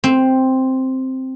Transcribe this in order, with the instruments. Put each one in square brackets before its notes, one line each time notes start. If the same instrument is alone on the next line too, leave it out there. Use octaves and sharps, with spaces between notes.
[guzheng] C4